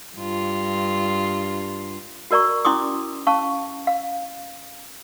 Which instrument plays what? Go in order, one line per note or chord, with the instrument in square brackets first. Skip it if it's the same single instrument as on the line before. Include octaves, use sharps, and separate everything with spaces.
[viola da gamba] G2 F4
[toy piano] F#4 A#4 D5 A#5 C#6
C#4 E4 C6 D6 D#6
C#4 F5 A5 C#6
F5